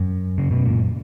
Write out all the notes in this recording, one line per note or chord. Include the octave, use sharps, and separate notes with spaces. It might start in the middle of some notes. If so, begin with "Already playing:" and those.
Already playing: F#2
C#3
B2
A#2